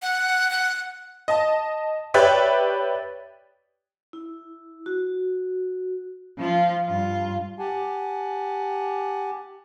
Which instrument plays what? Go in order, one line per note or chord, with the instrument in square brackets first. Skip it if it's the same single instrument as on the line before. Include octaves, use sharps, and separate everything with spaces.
[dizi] F#5
F#5
[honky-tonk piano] D#5 A5
G4 B4 C#5 D5 E5 G5
[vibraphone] E4
F#4
[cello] F3 F4
G2 F4
[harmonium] G4 F#5 G#5 A5